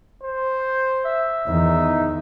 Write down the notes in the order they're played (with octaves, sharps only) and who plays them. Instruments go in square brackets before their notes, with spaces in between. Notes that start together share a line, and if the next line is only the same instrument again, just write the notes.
[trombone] C5
[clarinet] E5
[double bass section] E2 D#3 [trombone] D#4